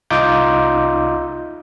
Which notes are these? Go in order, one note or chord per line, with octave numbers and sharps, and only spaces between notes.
C2 D#4 F4 D6 G6